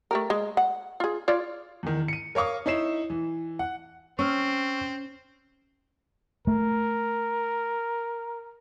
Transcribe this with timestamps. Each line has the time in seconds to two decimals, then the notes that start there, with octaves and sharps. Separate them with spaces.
0.11 A3 G4 A#4
0.30 G#3
0.57 F#5
1.00 F4 G#4
1.28 F4 C#5 D5
1.83 E2 D#3
2.08 C#7 D#7
2.35 A#4 C#5 F5 C#6 D#6
2.66 D#4 E4 C#5 C7 E7
3.10 E3
3.59 F#5
4.19 C4 C#4 C#6 E6 F6
6.47 A3 A#4